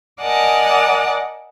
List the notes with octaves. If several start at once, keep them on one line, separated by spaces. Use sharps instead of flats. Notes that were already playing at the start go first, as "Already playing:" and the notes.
A#4 D5 D#5 F#5 G#5 A5